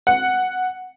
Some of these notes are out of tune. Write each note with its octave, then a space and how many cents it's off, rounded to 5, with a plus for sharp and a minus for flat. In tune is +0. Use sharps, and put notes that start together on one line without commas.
F#5 -5